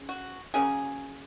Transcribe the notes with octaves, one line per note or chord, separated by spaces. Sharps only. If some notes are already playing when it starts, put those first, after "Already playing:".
Already playing: C#3
F#4
C#3 F#3 A#3 C#4 G#4